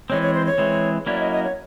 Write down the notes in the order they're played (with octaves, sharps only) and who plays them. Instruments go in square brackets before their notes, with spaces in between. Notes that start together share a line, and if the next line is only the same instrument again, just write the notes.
[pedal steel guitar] E3 G#3 C4 [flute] C#5
[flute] C#5
C5
C#5
[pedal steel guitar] E3 G#3 C4
[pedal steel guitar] F#3 A#3 C#4 E4 [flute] D5
[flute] D#5
D#5
C#5